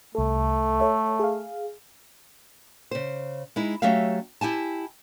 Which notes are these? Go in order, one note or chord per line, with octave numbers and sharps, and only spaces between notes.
C2 A3 A4
A4 C#5 E5
G#4 F5
C#3 C5
G#3 D#4 E4
F#3 A3 C#4 G4 E5 F5
E4 G4 G#5 A5